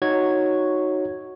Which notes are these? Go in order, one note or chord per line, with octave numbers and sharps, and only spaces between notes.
D#4 F#4 C#5 G#6